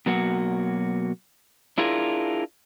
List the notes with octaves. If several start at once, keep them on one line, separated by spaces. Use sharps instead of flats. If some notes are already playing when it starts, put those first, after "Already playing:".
B2 F#3 A#3 F#4
D4 E4 F4 G#4 A#4